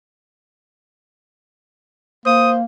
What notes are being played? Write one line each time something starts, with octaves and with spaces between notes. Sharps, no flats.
A#3 C5 D#6